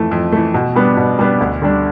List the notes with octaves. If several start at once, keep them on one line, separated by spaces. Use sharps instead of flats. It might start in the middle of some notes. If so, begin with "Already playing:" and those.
Already playing: F2 E3 A3
F2
E3 A3
B2
G3 B3 D4
B2
G3 B3 D4
D2
D3 G3 D4